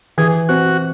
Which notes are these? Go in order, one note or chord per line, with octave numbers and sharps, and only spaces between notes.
E3 G#4
C4 F#4